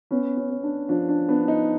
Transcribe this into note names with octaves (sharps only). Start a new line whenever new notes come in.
B3 C#4
C#4
B3
D4
F3 D4
D4
B3 D4
D4
D#4